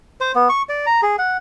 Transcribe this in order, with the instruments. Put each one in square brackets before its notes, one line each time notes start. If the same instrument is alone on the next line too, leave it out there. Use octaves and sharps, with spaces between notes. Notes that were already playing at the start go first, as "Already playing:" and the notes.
[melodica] C5
B3
C#6
D5
A#5
G#4
F#5